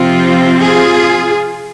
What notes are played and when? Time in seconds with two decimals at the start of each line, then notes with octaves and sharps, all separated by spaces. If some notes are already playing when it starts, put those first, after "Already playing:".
Already playing: C3 F3 C4 F4
0.62 F4 G#4